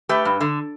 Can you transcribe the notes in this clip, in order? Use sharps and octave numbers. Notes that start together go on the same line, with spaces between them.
A3 G4 B4
G2
D3